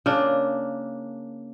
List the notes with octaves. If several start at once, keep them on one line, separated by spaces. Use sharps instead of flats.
C#3 A#3 D4